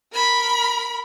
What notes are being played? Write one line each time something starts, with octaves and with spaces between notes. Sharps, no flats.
A#4 B5